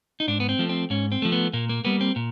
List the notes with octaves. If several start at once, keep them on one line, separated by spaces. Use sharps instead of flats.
D#4
G#2 D4
B3
C4
F3 A3
C4
G#2 C#4
C4
F3 A3
B3
A#2 A#3
A#3
G3 A#3 B3
C4
A#2